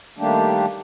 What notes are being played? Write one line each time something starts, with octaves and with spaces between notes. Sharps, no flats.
D#3 G3 A3 A#3 D4 G4